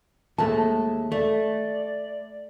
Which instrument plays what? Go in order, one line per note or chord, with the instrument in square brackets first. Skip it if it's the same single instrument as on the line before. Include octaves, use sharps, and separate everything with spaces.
[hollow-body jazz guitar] D#2 G#3 A3 [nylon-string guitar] A5
[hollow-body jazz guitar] A3 [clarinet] D5